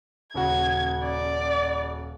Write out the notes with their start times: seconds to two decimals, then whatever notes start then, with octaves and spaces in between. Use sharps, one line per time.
0.34 D#1 C#3 F#4 G#6
1.04 D5